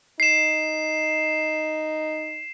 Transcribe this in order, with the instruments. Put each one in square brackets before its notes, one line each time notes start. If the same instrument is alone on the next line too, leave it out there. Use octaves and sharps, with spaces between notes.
[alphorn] D#4 [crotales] C7 E7